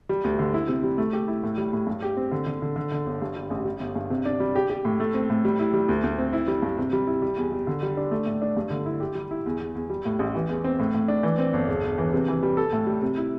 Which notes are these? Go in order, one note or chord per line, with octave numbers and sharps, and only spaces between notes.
G3
D2
D3
E4
C3
G3
A3
G4
E4
A2
G3
A2
G2
G4
C4
D3
D3
D3
D3
D3
G1
G2
G3
A1
G3
G1
G2
C3
D4
G3
G4
G4
A2
A3
C4
A2
G3
E4
G3
D2
D2
C4
E4
G3
G2
C3
G3
E4
G3
E2
G3
D3
G3
D4
A3
A2
D4
G2
D3
E4
G4
G3
E4
E2
E2
E2
G3
A2
A1
E3
E2
C4
A2
A2
D4
E3
C4
G1
E1
E1
E3
C3
E3
G3
A4
A2
G3
C3
E4